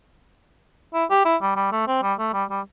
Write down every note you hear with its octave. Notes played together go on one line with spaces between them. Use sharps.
E4
G4
E4
G3
G3
A3
C4
G3
A3
G3
G3